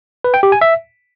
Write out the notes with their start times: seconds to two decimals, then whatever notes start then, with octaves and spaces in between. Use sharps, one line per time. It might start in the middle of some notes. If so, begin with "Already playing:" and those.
0.24 B4
0.34 G5
0.43 G4
0.52 G#5
0.61 E5